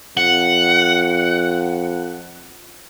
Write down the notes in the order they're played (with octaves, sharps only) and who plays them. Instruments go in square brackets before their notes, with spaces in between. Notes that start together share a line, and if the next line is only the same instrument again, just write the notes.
[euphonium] F2 [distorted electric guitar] F#5